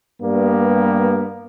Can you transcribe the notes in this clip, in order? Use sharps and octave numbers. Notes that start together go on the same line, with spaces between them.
G2 G3 A#3 B3